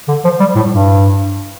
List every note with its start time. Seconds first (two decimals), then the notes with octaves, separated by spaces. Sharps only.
0.08 D3
0.24 F3
0.40 G3
0.56 A2
0.71 G2